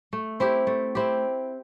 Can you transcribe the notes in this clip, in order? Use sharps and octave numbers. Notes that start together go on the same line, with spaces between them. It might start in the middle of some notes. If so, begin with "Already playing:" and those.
A3
C4 E4 G4
A3
C4 E4 G4